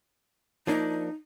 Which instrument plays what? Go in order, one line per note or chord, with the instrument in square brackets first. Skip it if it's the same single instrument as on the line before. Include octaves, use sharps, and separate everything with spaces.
[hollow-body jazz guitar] F3 A#3 D4 [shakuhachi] D#4